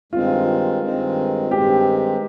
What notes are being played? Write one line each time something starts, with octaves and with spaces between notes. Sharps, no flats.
G2 D#3 G#3 C4 F4
G2 D#3 G#3 C4
G2 D#3 G#3 C4 G4